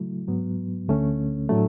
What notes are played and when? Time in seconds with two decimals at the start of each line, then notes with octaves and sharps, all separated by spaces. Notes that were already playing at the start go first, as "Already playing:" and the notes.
Already playing: C#3 F#3 A3 E4
0.28 G#2 F#3 B3
0.88 D2 D3 A3 C#4
1.49 A2 F#3 A3 D4